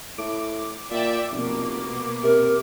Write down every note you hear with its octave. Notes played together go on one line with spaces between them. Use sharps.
A2 D6
A#2 D5 E5 G5
F1 B2 A#3
C3 A#4